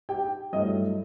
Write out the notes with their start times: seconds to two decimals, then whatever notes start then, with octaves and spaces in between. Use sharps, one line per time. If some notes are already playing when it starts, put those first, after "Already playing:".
0.09 G4 G5
0.53 G2 F#3 A3 E4 D#5